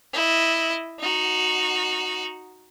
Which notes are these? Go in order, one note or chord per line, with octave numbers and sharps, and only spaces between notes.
E4 D#5
D#4 F#4